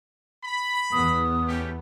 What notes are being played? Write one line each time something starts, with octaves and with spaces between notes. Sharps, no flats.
B5
E2 B3 D#6
A3 C#4 G4